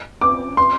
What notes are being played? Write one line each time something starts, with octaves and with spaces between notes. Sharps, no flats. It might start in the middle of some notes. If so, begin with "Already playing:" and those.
D6
C6